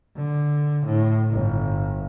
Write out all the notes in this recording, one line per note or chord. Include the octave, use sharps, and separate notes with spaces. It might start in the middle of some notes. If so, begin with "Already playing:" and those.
D3
A2
G1